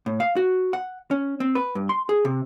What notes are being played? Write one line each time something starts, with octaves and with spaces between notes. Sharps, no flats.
A2
F5
F#4
F#5
C#4
C4
B4
G2
C6
G#4
C3